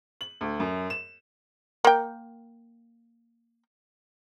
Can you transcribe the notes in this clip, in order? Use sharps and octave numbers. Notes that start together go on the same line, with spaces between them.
F#7
D2
F#2
E7
A#3 G5